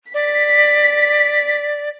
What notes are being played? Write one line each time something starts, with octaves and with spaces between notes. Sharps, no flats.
D5 B6